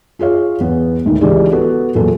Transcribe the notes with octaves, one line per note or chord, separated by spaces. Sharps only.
F4 G#4 C#5 F5
E2 B3
D2 G#2 D#3
C#2 E3 G4 G#4 D5
B3 F#4 A4
E2 A#2 F#3 A4